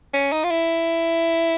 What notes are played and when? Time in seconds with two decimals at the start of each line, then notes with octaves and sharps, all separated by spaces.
0.13 C#4
0.32 D#4
0.44 F4
0.51 E4